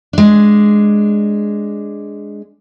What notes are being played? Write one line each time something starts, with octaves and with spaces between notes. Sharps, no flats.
G#3 D4